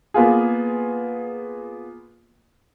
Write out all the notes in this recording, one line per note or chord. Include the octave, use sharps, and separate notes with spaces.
A#3 B3 F4 G#4